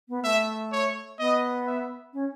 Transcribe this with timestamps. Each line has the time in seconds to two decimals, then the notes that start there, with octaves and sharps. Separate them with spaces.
0.09 B3
0.24 A3 E5
0.72 C#5
1.19 B3 D#5
1.67 E5
2.14 C#4